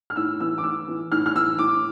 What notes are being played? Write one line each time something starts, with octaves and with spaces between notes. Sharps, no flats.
F6
A2 E6
E3 E6
D6
A2 E6
E3
A2 F6
F6
E3 E6
A2 D6